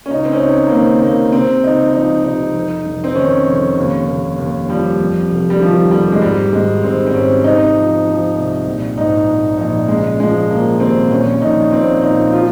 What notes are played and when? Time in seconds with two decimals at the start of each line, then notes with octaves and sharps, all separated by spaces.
0.06 C#4
0.10 C#2 D#4
0.25 C4
0.32 C#4
0.41 C#2 D#4
0.67 A#3
0.72 D#3 C4
1.02 C3 A#3
1.32 C3 C4
1.64 C#2 D#4
1.93 F3 D#4
2.24 C3 D#4
2.54 F1
2.86 F1
3.04 C4
3.16 D#3 C#4
3.46 F1
3.77 D#2
4.07 D#2
4.38 D#2
4.69 F3 G3
5.00 F2
5.30 F1
5.50 G3
5.61 D#3 F3
5.91 F1 G3
6.12 G#3
6.22 G#2 G3
6.52 G#1 G#3
6.83 G#1 C4
7.07 C4
7.13 G#2 C#4
7.44 C3 D#4
7.74 F3
8.06 F3
8.35 C2
8.66 A#1
8.97 G#2 D#4
9.28 G#2
9.58 A#1 D#4
9.88 C#3 G#3
10.20 F3 G#3
10.50 F3 A#3
10.80 D#2 C4
11.10 A#1 C#4
11.42 A#1 D#4
11.72 A#2 C4
12.02 A#2 D#4
12.33 F3 F4